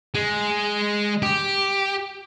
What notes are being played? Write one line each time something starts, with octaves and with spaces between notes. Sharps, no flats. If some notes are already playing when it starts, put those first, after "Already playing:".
G#3
G4